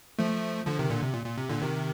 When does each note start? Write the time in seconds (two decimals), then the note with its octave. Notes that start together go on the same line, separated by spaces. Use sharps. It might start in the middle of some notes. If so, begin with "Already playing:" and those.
0.19 F3 A3
0.67 D3 F3
0.79 C3 D#3
0.90 A#2 D3
1.03 C3
1.14 A#2
1.26 A#2
1.37 C3
1.49 A#2 D3
1.62 C3 D#3